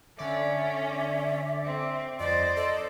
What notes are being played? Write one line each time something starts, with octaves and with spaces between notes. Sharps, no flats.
D3 C#4 D5 E5
C4
F2 C5 D5 D#5
A4 D#5